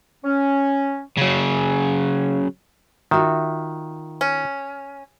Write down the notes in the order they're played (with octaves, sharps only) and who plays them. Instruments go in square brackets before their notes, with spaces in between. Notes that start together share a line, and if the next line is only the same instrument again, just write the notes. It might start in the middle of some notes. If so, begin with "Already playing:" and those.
[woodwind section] C#4
[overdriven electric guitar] C#3 F#3
[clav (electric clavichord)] D#3 [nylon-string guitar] F4 F#4 E5
[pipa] C#4